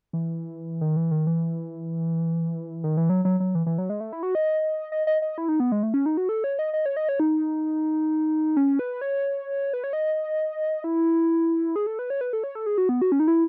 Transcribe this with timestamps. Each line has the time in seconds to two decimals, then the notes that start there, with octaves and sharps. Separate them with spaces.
0.13 E3
0.81 D#3
0.97 E3
1.11 D#3
1.27 E3
2.84 D#3
2.97 E3
3.10 F#3
3.25 F#3
3.40 F#3
3.55 E3
3.66 E3
3.78 F#3
3.90 G#3
4.00 A3
4.13 E4
4.23 F#4
4.35 D#5
4.92 D#5
5.07 D#5
5.22 D#5
5.38 E4
5.48 D#4
5.60 B3
5.72 G#3
5.83 A3
5.94 C#4
6.06 D#4
6.17 F#4
6.29 A4
6.44 C#5
6.59 D#5
6.73 D#5
6.86 C#5
6.97 D#5
7.09 C#5
7.20 D#4
8.57 C#4
8.79 B4
9.01 C#5
9.73 B4
9.84 C#5
9.93 D#5
10.84 E4
11.76 G#4
11.87 A4
11.99 B4
12.10 C#5
12.21 B4
12.33 A4
12.44 C#5
12.55 A4
12.66 G#4
12.78 F#4
12.89 B3
13.02 F#4
13.12 C#4
13.20 D#4
13.28 E4